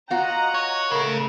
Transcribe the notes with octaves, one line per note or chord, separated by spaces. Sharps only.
F4 F#4 D#5 F#5 A#5
C#5
C#3 G#3 A3 A#4